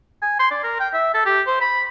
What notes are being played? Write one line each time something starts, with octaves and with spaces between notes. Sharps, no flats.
G#5
C6
D5
A#4
G5
E5
A4
G4
C5
B5